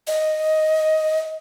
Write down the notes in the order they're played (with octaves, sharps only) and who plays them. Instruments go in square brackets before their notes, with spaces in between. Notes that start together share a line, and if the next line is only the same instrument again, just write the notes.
[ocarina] D#5